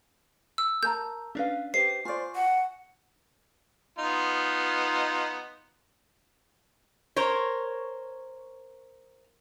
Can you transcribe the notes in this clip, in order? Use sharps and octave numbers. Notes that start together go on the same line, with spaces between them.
E6
A#4 A5 A#5 G6
C#4 D4 B4 D5 F5
G4 B4 C5 D#5 C7
F4 C5 D5 G#5 C#6
F#5
B3 D#4 F4
A#4 C5 C#5